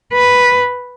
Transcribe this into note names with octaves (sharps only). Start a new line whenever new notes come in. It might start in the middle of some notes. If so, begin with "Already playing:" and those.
B4